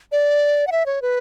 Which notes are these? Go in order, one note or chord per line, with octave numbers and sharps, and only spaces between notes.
D5
F#5
E5
C#5
B4